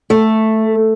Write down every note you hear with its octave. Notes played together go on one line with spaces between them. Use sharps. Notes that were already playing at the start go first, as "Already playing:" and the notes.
A3